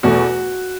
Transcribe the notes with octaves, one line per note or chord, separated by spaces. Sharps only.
E2 B2 A3 F#4